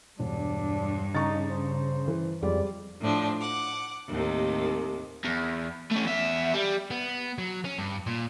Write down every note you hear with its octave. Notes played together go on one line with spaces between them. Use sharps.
E1 G2 D4
C#3 D#4 A#5 C#6 A6
C5
E3
F2 G3 G#3 D5
A2 F3 D4
F#5 D6
D#2 A2 C3 D#3
E2
A3 C#4
E2 E5
G3
B3
F#3
C#4
G2
A#2